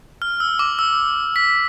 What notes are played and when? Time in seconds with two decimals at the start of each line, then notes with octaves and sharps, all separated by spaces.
0.22 F6
0.40 E6
0.59 D6
0.79 E6
1.36 B6